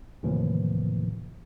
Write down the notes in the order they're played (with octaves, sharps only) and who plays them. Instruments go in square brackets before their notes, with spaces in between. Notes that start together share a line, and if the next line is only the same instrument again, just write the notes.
[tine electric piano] D#2 A2 C3 E3 F3